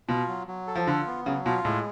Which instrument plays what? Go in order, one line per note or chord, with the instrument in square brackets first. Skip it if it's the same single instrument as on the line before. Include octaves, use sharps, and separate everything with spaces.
[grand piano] B2 [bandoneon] F4
[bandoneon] F#3
F#3
A4
[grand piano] F3
[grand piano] D3 [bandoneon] F4
[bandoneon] B3
[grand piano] C#3 [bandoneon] F#3
[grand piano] B2 [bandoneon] F4
[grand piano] A2 [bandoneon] G#3